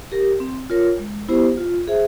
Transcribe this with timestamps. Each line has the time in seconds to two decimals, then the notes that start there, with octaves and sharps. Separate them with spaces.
0.12 G4 A#4
0.40 C4
0.70 F4 A#4 C#5
0.99 G#3
1.28 B3 E4 G4 C5
1.57 F4
1.88 G#4 C5 E5